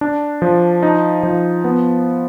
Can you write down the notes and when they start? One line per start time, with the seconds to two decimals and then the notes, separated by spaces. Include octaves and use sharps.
0.01 D4
0.42 F3
0.83 D#4
1.23 F3
1.64 B3